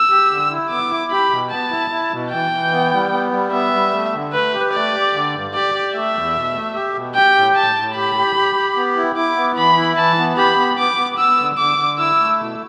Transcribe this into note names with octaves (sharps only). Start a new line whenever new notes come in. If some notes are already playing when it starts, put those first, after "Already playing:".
Already playing: E6
G4
D3
E4
B3 D6
E4
G4 B5
B2
B3 A5
E4
E4
B2
E3 G5
E3
B3
G3
B3
G3
B3 E5
G3
A3
D3
A3 B4
G4
A3 D5
G4
D3
G2
G4 D5
G4
A3 E5
E2
B2
A3
G4
B2
G4 G5
A2
A2 A5
A2
G4 B5
G4
G4
G4
B3
E4
E4 D6
B3
E3 B5
E4
E3 A5
B3
G4 B5
B3
B3 D6
B3
B3 E6
D3
D3 D6
D3
E4 E6
A3
B2